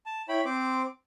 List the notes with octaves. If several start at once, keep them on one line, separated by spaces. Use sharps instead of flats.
A5
E4 C#5 G5 B5
C4 C5 D6